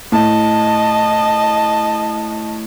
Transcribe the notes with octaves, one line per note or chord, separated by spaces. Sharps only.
A2 D#5 A5